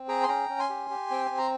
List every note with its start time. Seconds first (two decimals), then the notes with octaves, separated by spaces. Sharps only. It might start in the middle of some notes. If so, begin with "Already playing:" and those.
Already playing: C4
0.08 G#4 G5 A#5
0.23 C6
0.28 C#4 G5 A#5
0.49 C#4
0.59 G#5 C6
0.69 G4
0.90 G4
1.10 C4 G5
1.26 G#5
1.31 C4
1.38 A#5